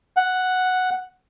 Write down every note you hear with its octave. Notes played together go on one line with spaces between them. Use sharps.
F#5